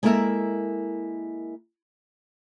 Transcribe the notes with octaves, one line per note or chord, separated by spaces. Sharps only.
G#3 A#3 E4 A4 A#4 E5